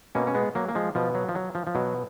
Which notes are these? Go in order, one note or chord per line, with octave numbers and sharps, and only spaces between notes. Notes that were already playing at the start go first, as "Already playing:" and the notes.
B2 A#3 C#4
C#4
G#3 B3
F#3 A#3
A#3
F3 G#3
B2 F3
F#3
F3
F#3
F3
F3
B2 F#3